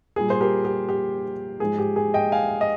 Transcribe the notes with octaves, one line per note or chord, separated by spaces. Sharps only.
A#2 G3 G#4
C5
G4 A#4
G4
G4
G#2 F3 G#3 G#4
G4
G#4
D#5 G5
F5 G#5
D#5